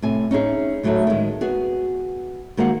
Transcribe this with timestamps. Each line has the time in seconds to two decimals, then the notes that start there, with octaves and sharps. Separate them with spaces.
0.02 A2 C3 G#5
0.31 C#4 D#4 E4 G#4
0.83 D2 A2 F#3 G#3 A3 D#4
1.07 D#3 G#3
1.41 B3 F#4 G#4
2.57 D#3 G#3 A#3 F#4 C5 F#5